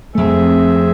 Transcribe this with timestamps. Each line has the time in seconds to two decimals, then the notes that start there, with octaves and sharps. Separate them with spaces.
0.15 F2 A3 C4 G#4 E5